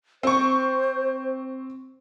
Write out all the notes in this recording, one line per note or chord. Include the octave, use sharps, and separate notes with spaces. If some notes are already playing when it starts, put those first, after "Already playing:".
C4 C5 C#6